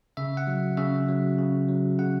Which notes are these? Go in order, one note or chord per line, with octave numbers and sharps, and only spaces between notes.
C#3 E5
F#5
F#3
C#3 E5
F#3
C#3
F#3
C#3 F#5